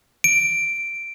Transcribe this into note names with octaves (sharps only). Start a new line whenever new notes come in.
D7